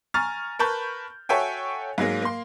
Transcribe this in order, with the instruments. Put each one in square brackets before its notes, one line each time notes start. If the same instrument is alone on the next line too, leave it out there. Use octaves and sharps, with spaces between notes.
[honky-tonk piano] G#5 A#5 C#6 F6 A6
A#4 B4 A5 B5 C#6 G6
F#4 A4 C#5 E5 G5 G#5
G#2 F#3 G#3 A#3
A#3 C6